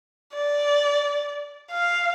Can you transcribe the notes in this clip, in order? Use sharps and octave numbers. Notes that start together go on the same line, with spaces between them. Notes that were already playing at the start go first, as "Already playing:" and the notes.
D5
F5